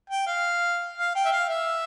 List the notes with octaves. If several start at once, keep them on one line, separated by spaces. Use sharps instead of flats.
G5
F5
F5
G5
E5
F5
E5